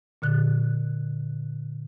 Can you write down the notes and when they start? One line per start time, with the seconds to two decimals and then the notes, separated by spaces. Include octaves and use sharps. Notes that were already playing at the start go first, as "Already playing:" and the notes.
0.22 A#2 D3 F#6